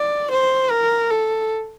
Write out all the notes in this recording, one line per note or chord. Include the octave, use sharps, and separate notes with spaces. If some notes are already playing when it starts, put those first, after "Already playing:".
Already playing: D5
C5
A#4
A4